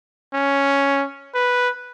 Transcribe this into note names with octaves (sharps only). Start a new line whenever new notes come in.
C#4
B4